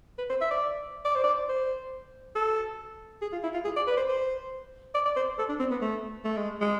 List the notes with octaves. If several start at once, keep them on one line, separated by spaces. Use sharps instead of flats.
B4
C5
E5
D5
D5
C5
D5
C5
A4
G#4
F4
E4
F4
G#4
D5
B4
C5
C5
D5
D5
C5
A4
D4
C4
B3
A3
A3
G#3
G#3